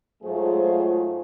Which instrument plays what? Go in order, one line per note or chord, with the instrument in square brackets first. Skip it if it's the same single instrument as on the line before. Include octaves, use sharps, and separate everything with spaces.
[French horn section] G#2 F#3 A3 F4 G#4 C5